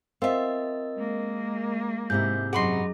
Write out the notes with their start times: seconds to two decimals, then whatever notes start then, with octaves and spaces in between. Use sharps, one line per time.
0.22 C4 F4 A#4 D#5 E5
0.97 G#3 A#3
2.10 G#2 C3 E4 G6
2.53 F#2 D#4 F#4 G#4 B5 C6